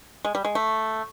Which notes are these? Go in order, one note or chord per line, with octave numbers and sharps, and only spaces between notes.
G#3
G3
G#3
A3